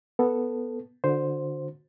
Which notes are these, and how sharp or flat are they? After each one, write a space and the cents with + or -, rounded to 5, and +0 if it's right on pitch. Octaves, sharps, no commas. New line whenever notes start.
B3 +0 A4 +0
D3 +0 F#4 -35 C5 +0